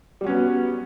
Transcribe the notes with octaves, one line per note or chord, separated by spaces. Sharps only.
F#3 G3 B3 C#4